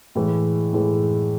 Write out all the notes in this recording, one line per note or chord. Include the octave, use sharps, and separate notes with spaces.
A2 E3 G#3
A2 E3 G#3